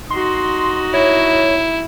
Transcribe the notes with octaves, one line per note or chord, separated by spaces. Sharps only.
D#4 F#4 C6
E4 C#5